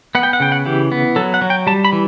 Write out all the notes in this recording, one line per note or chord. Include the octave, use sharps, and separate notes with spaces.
B3 F#5
G5
F#5
C#3 G5
F#5
E3 G4
B3
F#3 A4
F#5
F#3
G5
G3 A5
B5
E3